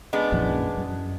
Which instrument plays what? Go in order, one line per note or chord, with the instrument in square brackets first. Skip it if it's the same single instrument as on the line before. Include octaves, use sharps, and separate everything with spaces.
[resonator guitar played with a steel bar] G#3 B3 D4
[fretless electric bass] A#1 F#2 E3
F#2